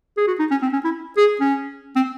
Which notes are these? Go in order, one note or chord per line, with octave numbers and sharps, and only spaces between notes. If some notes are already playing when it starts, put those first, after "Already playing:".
G#4
F#4
D#4
C#4
C4
C#4
E4
G#4
C#4
C4